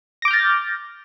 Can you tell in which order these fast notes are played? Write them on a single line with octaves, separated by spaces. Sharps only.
A#6 D6 G6 F6 A6